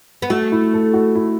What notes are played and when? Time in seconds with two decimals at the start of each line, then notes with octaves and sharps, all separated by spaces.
0.22 B3
0.30 A3 F#4
0.52 E4
0.73 A4
0.94 F#4
1.15 E4